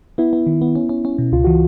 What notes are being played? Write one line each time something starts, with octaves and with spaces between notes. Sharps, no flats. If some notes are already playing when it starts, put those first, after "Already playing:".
B3 E4
B3
D#3
B3
C#4
C#4
C#4
B2
C#2 F4
E3 F#4